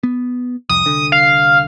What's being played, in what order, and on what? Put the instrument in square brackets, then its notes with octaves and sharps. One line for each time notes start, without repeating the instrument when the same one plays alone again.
[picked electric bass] B3
[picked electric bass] C2 F2 [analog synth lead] D#6
[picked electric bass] C2 D3
[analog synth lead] F5